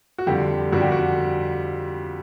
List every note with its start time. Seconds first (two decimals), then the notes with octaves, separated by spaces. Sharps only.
0.18 F#4
0.27 F2 D3 G3 G4
0.72 F2 D3 G3 F#4
0.82 G4
0.92 F#4